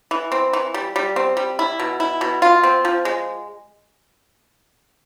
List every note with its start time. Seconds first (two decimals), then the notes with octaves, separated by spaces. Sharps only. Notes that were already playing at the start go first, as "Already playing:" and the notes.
0.11 E3
0.32 C4
0.53 E3
0.74 G3
0.96 G3
1.16 C4
1.37 G3
1.59 E4
1.80 B2
2.00 E4
2.21 B2
2.42 F4
2.63 C4
2.85 F3
3.05 G#3